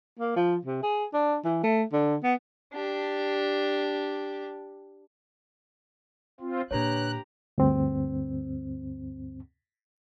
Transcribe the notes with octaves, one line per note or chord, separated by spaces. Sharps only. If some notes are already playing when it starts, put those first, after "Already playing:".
A#3
F3
C3
G#4
D4
E3
A3
D3
B3
D4 G4
C4 F4
A#2 D3 D4 G4 B4 C#5 A#5 F#6
D2 G2 C4